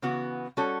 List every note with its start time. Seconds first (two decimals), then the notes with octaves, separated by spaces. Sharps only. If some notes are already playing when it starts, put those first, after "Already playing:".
0.02 C#3 E3 B3 F#4
0.57 G3 C#4 F#4 A4